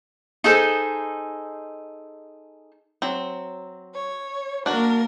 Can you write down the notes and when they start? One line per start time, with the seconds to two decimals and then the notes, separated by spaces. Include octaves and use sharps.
0.44 D#4 G#4 A4 C5
3.02 F#3 C4
3.93 C#5
4.66 A#3 D4 F#4 A#4